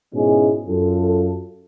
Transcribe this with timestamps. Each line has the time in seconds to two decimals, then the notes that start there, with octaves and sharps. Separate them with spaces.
0.14 G#2 B2 G#3 C#4 E4 G#4
0.68 F#2 F4 A4